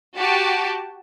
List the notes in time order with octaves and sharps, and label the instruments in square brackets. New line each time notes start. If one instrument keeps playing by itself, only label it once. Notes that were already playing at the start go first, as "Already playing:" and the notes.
[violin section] F#4 G4 A5